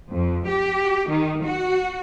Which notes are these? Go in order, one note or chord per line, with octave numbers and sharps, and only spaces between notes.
F2
G4
D#3
F#4